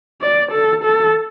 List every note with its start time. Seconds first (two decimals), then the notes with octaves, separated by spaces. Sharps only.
0.21 D5
0.52 A4
0.84 A4